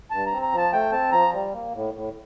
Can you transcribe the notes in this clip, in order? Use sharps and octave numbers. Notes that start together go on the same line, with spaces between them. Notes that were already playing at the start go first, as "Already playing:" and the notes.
G2 A5
A#5
C4
A#5
F3
A5
A3 G5
C4 A5
F3 A#5
G3
A#3
A2
A2